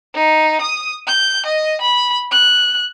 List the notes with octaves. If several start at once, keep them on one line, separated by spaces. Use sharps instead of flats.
D#4
D#6
G6
D#5
B5
F#6